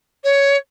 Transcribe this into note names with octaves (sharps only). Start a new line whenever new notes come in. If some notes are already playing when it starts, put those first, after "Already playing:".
C#5